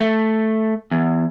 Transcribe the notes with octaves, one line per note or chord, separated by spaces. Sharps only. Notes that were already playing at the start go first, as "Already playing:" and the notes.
A3
E2